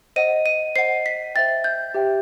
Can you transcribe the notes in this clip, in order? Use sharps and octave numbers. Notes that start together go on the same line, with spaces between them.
C5 D#5 F#5 D#7
D#7
C5 D#5 F#5 C7
B6
C5 E5 G5 A6
G6
G4 C5 E5 G5